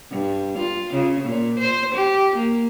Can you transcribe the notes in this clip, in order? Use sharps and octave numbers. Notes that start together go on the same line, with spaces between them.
G2
F4
C#3
A#2
C5
G4
A#3